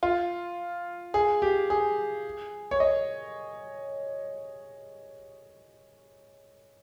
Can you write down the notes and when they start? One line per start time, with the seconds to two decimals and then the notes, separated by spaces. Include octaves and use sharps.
0.03 F4
1.14 G#4
1.42 G4
1.70 G#4
2.71 C#5
2.80 D#5